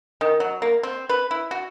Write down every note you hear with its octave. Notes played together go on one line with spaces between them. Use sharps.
D#3
F#3
A#3
C4
B4
E4
F#4